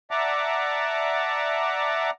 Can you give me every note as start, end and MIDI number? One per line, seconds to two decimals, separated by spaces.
0.11 2.10 74
0.11 2.10 76
0.11 2.10 78
0.11 2.10 81
0.11 2.10 82
0.11 2.10 86